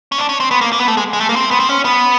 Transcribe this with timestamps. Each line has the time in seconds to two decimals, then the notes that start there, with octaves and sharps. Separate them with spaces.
0.12 C#4
0.18 D4
0.29 C#4
0.40 C4
0.51 B3
0.61 A#3
0.73 A#3
0.80 B3
0.88 A3
0.97 G#3
1.13 G#3
1.21 A3
1.29 A#3
1.36 C4
1.51 B3
1.60 C4
1.70 C#4
1.85 B3